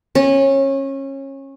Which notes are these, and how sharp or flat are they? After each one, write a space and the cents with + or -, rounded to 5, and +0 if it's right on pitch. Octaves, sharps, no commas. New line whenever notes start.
C#4 -25